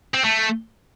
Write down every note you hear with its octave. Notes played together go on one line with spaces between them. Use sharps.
C4
A3